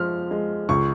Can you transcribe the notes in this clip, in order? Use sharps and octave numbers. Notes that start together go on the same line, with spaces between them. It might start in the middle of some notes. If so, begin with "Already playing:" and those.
Already playing: F3 G#3 F6
G#3
C#2 C#6